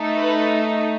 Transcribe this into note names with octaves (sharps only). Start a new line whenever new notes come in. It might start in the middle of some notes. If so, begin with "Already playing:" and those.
Already playing: A3 D#4 A4
B4